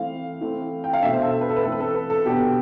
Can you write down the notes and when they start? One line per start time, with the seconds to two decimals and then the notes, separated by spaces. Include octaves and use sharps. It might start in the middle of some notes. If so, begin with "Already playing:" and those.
Already playing: E3 A3 C4 F5
0.41 E3 A3 C4
0.84 G5
0.93 F5
1.02 B2 A3 D4 E5
1.13 C5
1.23 A4
1.33 A4
1.41 B4
1.49 A4
1.56 B4
1.64 E3 A3 C4 A4
1.72 B4
1.80 A4
1.95 B4
2.10 A4
2.25 B2 B3 D4 G4